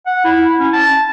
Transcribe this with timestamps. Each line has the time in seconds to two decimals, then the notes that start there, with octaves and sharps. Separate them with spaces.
0.06 F#5
0.24 E4
0.60 C#4
0.73 A5